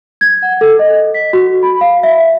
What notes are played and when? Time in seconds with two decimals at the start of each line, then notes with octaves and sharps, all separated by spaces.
0.21 G#6
0.42 F#5
0.61 A4
0.79 D#5
1.14 B6
1.33 F#4
1.63 B5
1.81 F5
2.03 E5